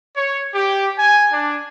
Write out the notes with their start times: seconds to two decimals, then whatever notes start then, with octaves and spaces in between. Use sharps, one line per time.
0.17 C#5
0.55 G4
0.98 G#5
1.32 D4